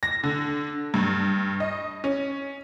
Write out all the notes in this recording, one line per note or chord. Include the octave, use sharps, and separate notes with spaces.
A#6
D3
G2
D#5
C#4